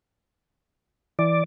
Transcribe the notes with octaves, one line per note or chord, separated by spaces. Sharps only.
E3 D5